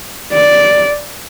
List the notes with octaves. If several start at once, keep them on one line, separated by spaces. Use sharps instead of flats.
D5